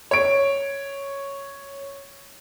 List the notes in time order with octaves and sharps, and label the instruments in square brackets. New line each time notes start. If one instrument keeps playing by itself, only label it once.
[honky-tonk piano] C#5 D7